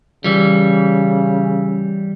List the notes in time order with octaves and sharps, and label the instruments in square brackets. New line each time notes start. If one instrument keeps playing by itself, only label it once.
[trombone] C#3 [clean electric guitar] E3 G3